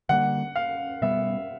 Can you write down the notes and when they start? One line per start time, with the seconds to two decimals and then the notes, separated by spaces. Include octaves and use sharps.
0.09 D3 G3 A#3 F#5
0.56 F5
1.02 B2 G3 B3 E5